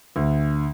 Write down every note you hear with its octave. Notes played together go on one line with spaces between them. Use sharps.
D2